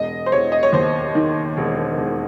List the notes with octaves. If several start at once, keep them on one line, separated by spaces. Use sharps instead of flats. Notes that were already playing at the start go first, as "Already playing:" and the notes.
Already playing: E1 D#5
C5
E1 C#5
D#5
C#5
D#2 C5
D#3
E1
E1